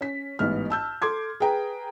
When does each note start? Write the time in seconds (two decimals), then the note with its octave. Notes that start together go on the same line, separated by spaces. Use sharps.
0.01 C#4 B6
0.39 A1 G#2 B3 F6
0.70 A5 E6 G6
1.02 A4 C6 D6 G#6
1.40 G#4 B4 G5 A#5